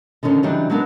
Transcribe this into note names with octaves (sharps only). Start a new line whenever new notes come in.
D3 D#3 F3 C#4 D4
C#3 E3 F#3 G3 D4 D#4
F#3 G#3 A#3 B3 D4 A#4